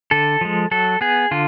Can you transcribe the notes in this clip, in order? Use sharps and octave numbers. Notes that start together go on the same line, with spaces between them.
D3 A4
F3 G#3
F#3 A4
B3 G#4
D3 F4